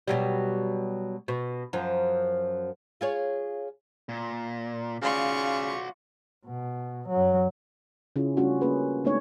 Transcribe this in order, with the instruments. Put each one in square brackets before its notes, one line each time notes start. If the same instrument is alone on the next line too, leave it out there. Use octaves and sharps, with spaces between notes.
[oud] B2 F#3 G3
B2
F#2 F3
F4 G#4 C#5
[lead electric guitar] A#2
[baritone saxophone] C#3 [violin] F4 C#6 [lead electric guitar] F#4 D5
[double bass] B2
F#2 F#3
[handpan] C#3 C#4 E4 F4 G#4
G3 A3 C#4 D4 F4 F#4
A#3 C#4 G#4 B4
G#3 A3 B3 D4 D#4 C#5